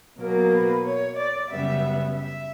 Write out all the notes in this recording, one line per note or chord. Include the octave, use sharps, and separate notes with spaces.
B2 F#3 A#3 A#4
B4
C#5
D5
F#2 C#3 G3 B3 E5
E5